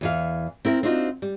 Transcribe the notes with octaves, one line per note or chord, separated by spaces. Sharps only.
E2 E3 F5
C4 E4 A#4
C4 D4 D#4 F4 F#4 C5
G3